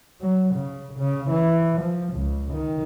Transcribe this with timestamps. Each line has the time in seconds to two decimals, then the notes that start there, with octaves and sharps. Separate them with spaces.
0.21 F#3
0.55 C#3
0.99 C#3
1.30 E3
1.81 F3
2.13 C#2
2.53 D#3